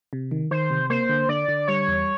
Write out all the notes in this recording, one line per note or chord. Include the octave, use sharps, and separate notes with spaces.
C3
D#3
D#3 C5
C3
A#3 C5
D3
D3 D5
D3
G3 C#5
E2